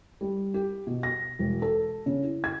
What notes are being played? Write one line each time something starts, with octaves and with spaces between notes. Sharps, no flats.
G3
G4
B2
A#6
E1
A4
C#3
E4
G#6